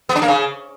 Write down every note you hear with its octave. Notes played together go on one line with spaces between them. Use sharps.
B3
D4
A#3
C#3